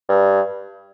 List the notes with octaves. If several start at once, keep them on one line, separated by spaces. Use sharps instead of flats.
G2